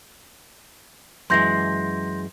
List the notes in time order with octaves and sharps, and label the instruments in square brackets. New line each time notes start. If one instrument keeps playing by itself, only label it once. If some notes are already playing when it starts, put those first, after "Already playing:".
[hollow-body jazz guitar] F#2 E3 G#3 [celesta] C6 G6 A#6